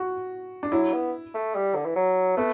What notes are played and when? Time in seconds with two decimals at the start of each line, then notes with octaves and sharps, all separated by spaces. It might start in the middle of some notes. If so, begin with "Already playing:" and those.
Already playing: F#4
0.63 D4
0.72 F#3 E4
0.93 B3
1.34 A3
1.55 G3
1.75 D3
1.86 E3
1.96 F#3
2.37 A3 B3